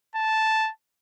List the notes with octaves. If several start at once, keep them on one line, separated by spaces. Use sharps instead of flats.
A5